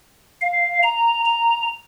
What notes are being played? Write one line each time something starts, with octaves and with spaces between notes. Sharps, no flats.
F5
A#5
A#5